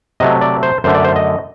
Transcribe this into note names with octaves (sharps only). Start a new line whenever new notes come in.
C3 F#3 A3 D#5
D5
C5
F#2 D3 A3 C5
D5
C5
D#5